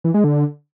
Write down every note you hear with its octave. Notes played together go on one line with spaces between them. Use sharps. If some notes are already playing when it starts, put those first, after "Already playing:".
E3
G#3
D3